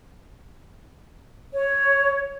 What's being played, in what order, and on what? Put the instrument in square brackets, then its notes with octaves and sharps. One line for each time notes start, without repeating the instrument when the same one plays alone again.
[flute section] C#5